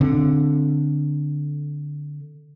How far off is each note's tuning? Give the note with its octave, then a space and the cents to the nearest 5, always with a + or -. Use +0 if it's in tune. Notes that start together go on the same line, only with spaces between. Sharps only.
D3 +0 C4 +0